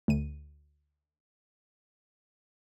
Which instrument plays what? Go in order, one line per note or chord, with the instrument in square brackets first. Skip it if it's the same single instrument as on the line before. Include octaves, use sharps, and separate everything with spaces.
[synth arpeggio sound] D2 D#7